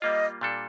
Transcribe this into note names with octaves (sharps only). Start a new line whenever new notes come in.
G3 A#3 F4 D#5
A#2 G3 D4 A4